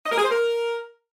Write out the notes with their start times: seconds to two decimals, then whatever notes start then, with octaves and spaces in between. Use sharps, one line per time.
0.05 D#5
0.11 A#4
0.18 G#4
0.24 C5
0.30 A#4